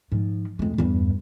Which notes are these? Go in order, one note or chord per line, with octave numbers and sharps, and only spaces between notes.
G#2 F3
F2 G#3
E2 G2